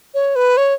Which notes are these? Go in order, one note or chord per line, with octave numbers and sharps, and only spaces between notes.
C#5
B4
C#5